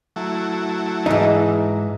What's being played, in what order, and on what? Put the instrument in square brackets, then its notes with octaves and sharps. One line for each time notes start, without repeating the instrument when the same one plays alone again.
[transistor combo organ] F#3 A3 E4
[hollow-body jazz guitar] G#2 D#4 [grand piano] E3 E5